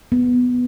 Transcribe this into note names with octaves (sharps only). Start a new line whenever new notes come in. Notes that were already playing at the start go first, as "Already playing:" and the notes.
B3